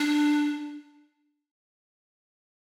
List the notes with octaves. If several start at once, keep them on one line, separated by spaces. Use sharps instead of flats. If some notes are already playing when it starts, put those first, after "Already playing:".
Already playing: D4